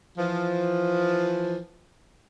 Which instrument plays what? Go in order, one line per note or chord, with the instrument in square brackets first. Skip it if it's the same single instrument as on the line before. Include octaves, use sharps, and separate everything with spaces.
[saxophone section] E3 F3